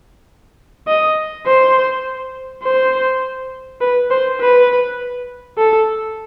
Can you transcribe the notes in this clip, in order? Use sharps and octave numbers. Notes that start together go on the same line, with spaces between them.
D#5
C5
C5
B4
C5
B4
A4